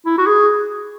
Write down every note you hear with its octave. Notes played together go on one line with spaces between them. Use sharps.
E4
F#4
G#4